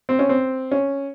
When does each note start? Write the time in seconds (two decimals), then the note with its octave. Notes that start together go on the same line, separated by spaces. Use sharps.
0.09 C4
0.19 C#4
0.29 C4
0.72 C#4